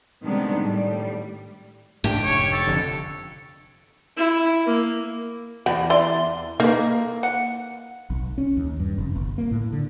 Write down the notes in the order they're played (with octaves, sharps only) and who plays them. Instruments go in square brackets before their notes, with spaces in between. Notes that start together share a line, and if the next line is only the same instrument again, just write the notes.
[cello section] C3 D#3 G3 G#3 B3 D4
A2 G3
[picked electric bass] G#2 A3 D4 [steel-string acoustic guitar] G4
[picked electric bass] F1 [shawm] C#5
[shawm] A4
[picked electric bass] F1 F2 D3
[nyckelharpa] E4
A#3
[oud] E2 [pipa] G4 [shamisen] F#5
[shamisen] E4 [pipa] D5 C6
[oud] A#3 [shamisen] D#4 B4
[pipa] F#5
[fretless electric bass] B1
C#4
D#2
G2
F1
G1
A#3
A2
D3